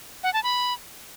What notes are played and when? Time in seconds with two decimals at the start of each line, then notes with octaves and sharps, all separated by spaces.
0.24 F#5
0.33 A5
0.43 B5